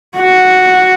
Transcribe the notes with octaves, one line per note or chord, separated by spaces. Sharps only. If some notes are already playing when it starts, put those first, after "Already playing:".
F#4